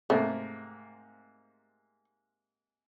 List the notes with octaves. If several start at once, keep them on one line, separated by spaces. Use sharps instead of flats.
G#2 C3 A3 A#3